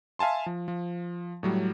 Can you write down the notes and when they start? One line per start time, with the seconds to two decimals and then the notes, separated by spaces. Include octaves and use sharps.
0.19 E5 F5 G#5 A5 C6
0.46 F3
0.68 F3
1.43 A2 F#3 G3